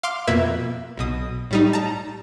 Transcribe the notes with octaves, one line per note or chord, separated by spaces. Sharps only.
F5 C6 D6 F6
F2 B2 A#3 B4 E5 G#6
B1 B2 D#6
A2 G3 D#4
A5 A#5